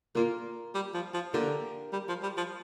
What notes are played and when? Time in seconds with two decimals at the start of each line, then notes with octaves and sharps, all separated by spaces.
0.15 A#2 A#3 F4 A#4
0.74 G3
0.94 F3
1.14 F3
1.33 D3 A#3 G4 A#4
1.93 G3
2.08 F3
2.23 G3
2.37 F3